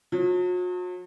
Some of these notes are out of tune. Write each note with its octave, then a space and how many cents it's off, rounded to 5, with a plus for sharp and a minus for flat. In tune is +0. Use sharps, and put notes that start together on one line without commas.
F#3 -45